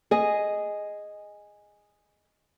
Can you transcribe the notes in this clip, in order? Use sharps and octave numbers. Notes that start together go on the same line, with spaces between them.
G#4 D#5